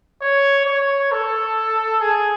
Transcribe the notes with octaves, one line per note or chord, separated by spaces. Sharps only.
C#5
C#5
A4
G#4